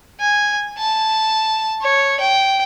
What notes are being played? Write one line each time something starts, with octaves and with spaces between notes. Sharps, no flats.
G#5
A5
C#5
G5